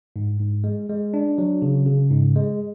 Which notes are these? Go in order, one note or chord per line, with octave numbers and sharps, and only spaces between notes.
G#2
G#2
G#3
G#3
D4
F#3
C#3
C#3
G#2
G#3